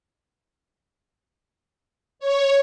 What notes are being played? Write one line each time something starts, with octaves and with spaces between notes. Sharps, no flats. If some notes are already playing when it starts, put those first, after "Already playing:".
C#5